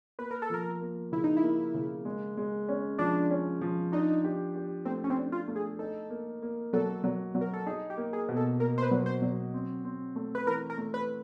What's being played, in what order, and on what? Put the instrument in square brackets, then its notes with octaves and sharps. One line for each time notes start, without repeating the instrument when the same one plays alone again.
[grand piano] A#3 [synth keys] B4
[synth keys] A#4
A4
[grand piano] F3 [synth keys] A#4
[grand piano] A#3
[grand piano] C#3 [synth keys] E4
[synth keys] D#4
E4
[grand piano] A#3
C#3
G#3
G#3
C#4
[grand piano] F3 [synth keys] D4
[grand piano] C#4
F3
[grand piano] D4 [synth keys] D#4
[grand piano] G4
G4
[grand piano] A3 [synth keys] C4
[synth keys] C#4
C4
[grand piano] D4
[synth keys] F4
[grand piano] A3
[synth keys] G#4
[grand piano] D#4 [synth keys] A4
[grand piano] A#3
A#3
[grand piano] F#3 [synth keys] A4
[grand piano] F#3
F#3
[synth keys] A#4
A4
[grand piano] D#4 [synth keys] G#4
[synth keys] G4
[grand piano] A#3
[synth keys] G#4
[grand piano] B2
[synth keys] A4
[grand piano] A#3 [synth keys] A#4
[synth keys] C5
B4
[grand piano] F#3
[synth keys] C5
[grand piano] F#3
C4
C4
A3
[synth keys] B4
[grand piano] E3 [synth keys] A#4
[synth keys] A#4
[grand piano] A3
[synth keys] B4